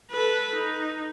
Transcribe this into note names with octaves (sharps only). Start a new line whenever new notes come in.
A4 B4
D#4